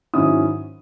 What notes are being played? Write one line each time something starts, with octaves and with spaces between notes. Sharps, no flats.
G#2 D#3 F#3 C#4 E4 D#6